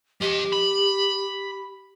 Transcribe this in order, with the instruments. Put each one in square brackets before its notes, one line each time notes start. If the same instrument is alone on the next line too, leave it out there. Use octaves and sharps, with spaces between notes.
[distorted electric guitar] F3 D#5 [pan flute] G4
[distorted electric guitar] B5